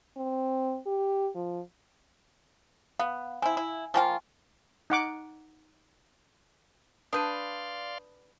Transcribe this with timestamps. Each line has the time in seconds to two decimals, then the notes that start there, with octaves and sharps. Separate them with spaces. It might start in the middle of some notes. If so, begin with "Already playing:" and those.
0.17 C4
0.86 G4
1.35 F3
2.99 B3 F5
3.42 C4 E4 G#5
3.57 E4
3.94 F3 A#3 F4 G5 G#5 C#6
4.90 D#4 F#5 D6
7.13 D4 B4 D5 F5 C6 D#6 G6 D#7